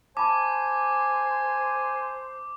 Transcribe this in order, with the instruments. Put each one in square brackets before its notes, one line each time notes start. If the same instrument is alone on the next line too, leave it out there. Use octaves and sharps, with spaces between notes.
[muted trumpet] C5 [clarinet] G#5 [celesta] A5 B5 [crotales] D6